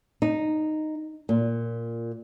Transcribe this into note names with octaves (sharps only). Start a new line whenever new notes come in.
D#4
A#2